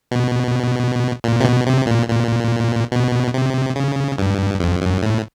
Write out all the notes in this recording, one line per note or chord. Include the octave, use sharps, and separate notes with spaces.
B2
A#2
C3
B2
C3
A#2
A#2
B2
C3
C#3
G2
F2
F#2
A2